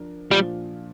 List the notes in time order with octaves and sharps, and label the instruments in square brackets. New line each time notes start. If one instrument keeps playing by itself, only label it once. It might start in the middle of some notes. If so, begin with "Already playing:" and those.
Already playing: [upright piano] F3 D4 A#4
[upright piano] A#2 F3 D4 F4 [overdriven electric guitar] G3